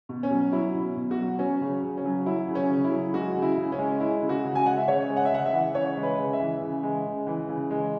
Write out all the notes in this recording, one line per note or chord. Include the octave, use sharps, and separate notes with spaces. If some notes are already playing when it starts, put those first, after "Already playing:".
B2
C#4
F#3
F#3 E4
B2
B2
F#4
F#3
F#3 C#4
C#3
C#3
C#4
F#3
F#3 E4
C#3
C#4
C#3
E4
F#3
G#3 F#4
C#3
E4
C#3
C#4
G#3
G#3 E4
C#3
F#4
C#3
G#5
G#3 F#5
E5
C#3 C#5
G#3
F#5
E5
C#3 F#5
E5
E3
C#3 C#5
G#3
B4
C#3
E5
E3
C#3
G#3
C#3
E3
C#3
G#3